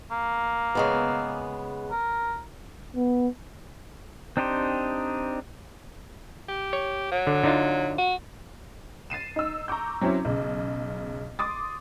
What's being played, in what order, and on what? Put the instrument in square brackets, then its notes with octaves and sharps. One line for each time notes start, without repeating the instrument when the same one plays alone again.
[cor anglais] A#3
[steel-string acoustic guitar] C#3 G#3 B3
[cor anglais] A#4
[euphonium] B3
[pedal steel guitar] C4 D4 D#4 G4 C5
[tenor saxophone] G4
[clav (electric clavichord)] C#5
[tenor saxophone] F#3
[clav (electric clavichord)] D3
D3 D#4 F4
[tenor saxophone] F#4
[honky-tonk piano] A6 C7 D#7 E7
D#4 E6
A#5 C#6 D6 G6
F#3 C4 C#4 E4
B1 C#3
C6 D6 D#6 A6